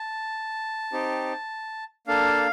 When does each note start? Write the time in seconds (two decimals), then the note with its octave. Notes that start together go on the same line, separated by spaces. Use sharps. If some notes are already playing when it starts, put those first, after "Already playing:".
Already playing: A5
0.92 C4 D#4 G4
2.07 A#3 D4 A4 F5